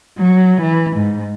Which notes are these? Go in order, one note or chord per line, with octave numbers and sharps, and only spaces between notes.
F#3
E3
G#2